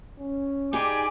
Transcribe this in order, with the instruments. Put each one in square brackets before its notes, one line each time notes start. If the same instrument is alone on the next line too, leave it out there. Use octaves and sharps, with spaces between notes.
[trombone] C#4
[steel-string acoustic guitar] D#4 G4 G#4 [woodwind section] D5 B5 D6 [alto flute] G#5